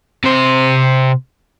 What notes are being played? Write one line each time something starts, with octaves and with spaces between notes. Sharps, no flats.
C3 C5